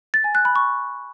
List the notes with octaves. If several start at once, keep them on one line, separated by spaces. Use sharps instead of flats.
A6
G#5
F#6
B5
C#6